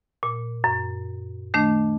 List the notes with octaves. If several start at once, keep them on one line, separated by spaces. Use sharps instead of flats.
A#2
F#2
D#3 A3 D4